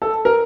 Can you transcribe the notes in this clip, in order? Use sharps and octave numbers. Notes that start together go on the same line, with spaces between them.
A4
A#4